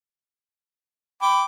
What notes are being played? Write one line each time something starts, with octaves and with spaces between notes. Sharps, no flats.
G5 B5 D6